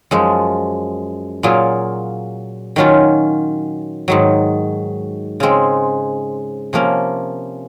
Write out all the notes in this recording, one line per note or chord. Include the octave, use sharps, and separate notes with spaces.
F#2 F3 G#3
A#2 F#3 A#3 F4 G#4
D#3 F#3 C#4 F4
G#2 D#3 F#3
C#3 G#3 C4
C3 F3 A#3 C#4